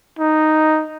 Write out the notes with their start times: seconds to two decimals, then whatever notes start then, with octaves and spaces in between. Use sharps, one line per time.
0.19 D#4